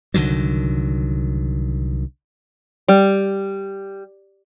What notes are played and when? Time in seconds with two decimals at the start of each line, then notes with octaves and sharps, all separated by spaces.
0.14 C2 D3 D#3 F#3
2.88 G3